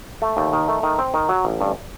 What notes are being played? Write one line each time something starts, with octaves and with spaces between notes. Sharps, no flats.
A3
D#2
D#3
A3
D#3
C4
D#3
F#3
A1
G2